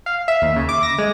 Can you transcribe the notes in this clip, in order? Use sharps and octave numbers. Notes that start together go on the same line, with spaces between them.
F5
E5
D#2
C#3
D6
A#6
G#3